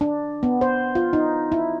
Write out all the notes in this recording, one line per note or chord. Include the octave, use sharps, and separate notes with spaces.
D4
B3
C5
F4
D#4
E4